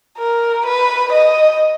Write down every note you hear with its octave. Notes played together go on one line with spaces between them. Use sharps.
A#4
B4
D#5